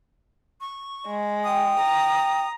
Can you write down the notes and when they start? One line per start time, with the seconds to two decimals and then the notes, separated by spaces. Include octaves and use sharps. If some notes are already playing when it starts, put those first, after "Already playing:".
0.61 C#6
1.07 G#3
1.44 G5 D#6
1.79 A#5